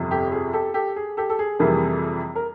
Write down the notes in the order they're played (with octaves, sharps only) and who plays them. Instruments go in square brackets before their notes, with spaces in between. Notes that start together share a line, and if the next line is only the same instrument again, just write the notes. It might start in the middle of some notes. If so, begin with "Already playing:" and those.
Already playing: [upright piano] G1 F2 C3
G4 A4
G#4
G4 A4
G4 A4
G#4
G4 A4
A4
G#4
F2 C3 E3 G3 A#3 G#4 A#4
A#4